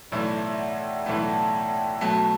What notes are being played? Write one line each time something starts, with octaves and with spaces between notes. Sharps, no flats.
B1 A2 E3 A3 D5
E5
F#5
F#5
G5
B1 A2 E3 A3 A5
A5
G5
G5
B2 F#3 A3 A5